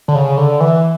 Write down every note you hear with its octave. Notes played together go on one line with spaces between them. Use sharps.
D3
C#3
D3
E3